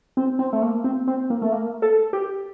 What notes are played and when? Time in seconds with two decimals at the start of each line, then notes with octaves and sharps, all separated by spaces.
0.17 C4
0.39 C4
0.53 A3
0.62 A#3
0.84 C4
1.07 C4
1.30 A#3
1.42 A3
1.52 A#3
1.82 A4
2.13 G4